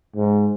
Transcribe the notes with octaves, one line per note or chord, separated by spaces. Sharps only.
G#2